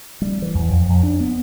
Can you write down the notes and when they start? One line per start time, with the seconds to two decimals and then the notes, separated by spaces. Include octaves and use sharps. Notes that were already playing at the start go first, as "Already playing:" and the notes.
0.22 G3
0.42 E3
0.55 E2
0.70 F2
0.89 F2
1.03 D4
1.20 B3